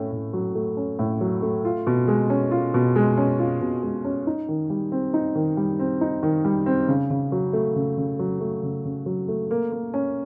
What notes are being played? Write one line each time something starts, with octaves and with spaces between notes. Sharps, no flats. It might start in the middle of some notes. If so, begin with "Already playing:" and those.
Already playing: A2 A3 C#4
A2
F#3
A3
C#4
A2
F#3
A3
F4
B2
G#3
C#4
F4
B2
G#3
C#4
F4
B2
G#3
C#4
D#4
D#3
G3
C4
D#4
D#3
G3
C4
D#4
D#3
G3
C4
C#3
C#3
F#3
A3
C#3
C#3
F#3
A3
C#3
C#3
F#3
A3
A#3
A#3
C#4